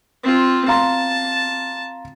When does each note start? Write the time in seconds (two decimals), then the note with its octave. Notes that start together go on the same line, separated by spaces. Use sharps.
0.24 C4 F4
0.68 F5 A5 A#5 C6